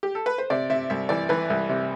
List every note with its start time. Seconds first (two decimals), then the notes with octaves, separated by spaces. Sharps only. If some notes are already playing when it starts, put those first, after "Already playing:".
0.03 G4
0.15 A4
0.26 B4
0.38 C5
0.50 C3 D5
0.70 C3 E5
0.90 C2 E5
1.09 E3 D5
1.29 E3 B4
1.50 C2
1.69 C3